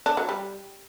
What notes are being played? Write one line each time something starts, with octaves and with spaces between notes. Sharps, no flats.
D4
F#3
G3